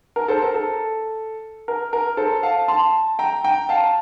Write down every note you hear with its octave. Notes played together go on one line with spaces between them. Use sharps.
A#4
A4 C5
A#4
A4
A#4
A#4
A4 C5
F5 A5
A5 C6
G5 A#5
G5 A#5
F5 A5